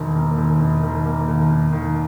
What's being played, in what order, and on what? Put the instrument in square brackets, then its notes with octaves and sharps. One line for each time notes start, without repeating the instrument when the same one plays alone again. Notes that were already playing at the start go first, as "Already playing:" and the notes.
Already playing: [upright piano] E1 D#2 D#3
A#3
D#2
E1
D#3
A#3
D#2
E1
D#3